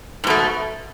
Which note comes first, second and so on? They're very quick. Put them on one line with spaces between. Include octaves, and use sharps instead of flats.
G#2 B2 A3